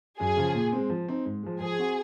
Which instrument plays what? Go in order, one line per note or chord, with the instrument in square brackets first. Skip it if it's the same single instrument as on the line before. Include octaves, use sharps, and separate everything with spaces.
[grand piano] F#2 [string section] G#4
[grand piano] C#3 F3
A#2
G#3 C4
F3
C4 D#4
G#2
F3 G#3
[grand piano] F3 [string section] G#4
[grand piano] C4 F#4